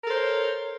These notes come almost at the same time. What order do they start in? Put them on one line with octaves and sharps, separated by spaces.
A#4 A4 C5 C#5